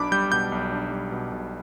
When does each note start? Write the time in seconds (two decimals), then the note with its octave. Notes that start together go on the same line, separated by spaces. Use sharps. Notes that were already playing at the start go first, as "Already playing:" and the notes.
Already playing: B1 B2 D4 B5 D6
0.12 G3 G6
0.32 B2 G6
0.52 B1
0.72 D4
0.91 G3
1.12 B2
1.32 B1